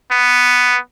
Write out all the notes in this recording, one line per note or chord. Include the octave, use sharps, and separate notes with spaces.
B3